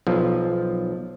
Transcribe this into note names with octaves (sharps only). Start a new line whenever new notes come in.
B1 F3